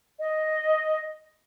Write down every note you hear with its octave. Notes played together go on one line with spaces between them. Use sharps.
D#5